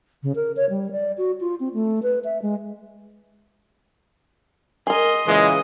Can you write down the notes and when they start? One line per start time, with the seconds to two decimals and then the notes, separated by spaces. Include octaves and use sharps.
0.23 C#3
0.36 A#4
0.56 C#5
0.70 G3
0.92 D5
1.18 F#4
1.41 F4
1.60 C4
1.74 A3
2.03 B4
2.24 E5
2.42 G#3
4.87 G#4 A#4 D#5 C6
5.27 A#2 C#3 E3 G#3 D#5